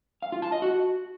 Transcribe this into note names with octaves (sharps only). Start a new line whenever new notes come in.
F5
F4
A5
D#5
F#4